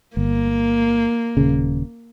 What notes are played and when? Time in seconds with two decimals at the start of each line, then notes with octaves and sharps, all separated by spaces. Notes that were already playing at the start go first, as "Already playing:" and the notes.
0.17 G1 A#3
1.37 D#1 C#3